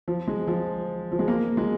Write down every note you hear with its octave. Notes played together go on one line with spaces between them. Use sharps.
F3
G#3
F3
F3
G#3
A#3
G#3